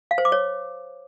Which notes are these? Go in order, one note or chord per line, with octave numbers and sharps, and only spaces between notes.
F5
C5
D6
C#5